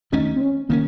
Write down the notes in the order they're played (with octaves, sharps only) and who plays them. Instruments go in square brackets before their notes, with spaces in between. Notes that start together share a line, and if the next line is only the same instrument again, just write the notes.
[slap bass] D#2 D#3 A3 C#4 [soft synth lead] D#4
[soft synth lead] C4
C#4
[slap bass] D#3 A3 C#4 [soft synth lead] A#3